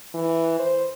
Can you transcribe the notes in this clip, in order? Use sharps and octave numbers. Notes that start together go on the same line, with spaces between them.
E3
C5